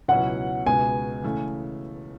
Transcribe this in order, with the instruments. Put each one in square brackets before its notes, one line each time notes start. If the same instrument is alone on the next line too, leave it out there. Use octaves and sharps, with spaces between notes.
[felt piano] C#2 B2 F#3 C#4 E4 [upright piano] F#5
[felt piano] C#2 B2 G#3 B3 F#4 [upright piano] G#5
[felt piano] C#3 E3 A3